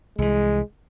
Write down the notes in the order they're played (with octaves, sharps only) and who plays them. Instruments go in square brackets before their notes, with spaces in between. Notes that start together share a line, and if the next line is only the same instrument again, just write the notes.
[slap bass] C2 E3 [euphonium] G#3